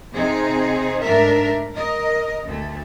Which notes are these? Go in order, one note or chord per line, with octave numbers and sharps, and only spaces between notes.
C3 C4 D#4 G#4
G#2 A3 D4 A#4 E5
A#4 D#5
D2 A3